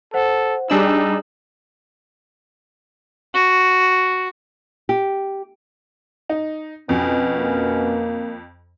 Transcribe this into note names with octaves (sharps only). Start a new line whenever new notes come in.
A4 C5 F#5
G3 D4 D#4 G#4 G#5 E6 F#7
F#4
G4
D#4
F2 B2 C#4
A#3